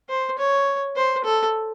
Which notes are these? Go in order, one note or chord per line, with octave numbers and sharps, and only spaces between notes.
C5
C#5
C5
A4